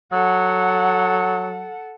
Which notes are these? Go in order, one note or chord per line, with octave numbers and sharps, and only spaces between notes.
F#3 A4 F#5